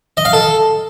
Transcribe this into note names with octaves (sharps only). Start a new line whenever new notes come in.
D#5
F5
A4